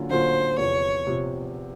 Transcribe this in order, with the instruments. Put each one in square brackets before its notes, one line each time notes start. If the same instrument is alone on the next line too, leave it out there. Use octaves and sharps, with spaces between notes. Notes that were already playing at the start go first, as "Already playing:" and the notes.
Already playing: [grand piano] D3 F#3 A#3 C#4 F4
[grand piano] D3 F#3 A#3 C#4 F4 [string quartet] C5
[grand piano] E2 C3 F3 [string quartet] C#5
[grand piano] C3 F3